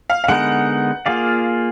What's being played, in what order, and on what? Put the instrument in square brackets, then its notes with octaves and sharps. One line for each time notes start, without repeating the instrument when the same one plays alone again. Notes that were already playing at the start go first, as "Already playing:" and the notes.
[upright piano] F5
F5
[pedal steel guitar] D3 G#3 B3 D#4 A#4 [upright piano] F#5
[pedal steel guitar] A#3 F4 G#4 D5 [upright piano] F5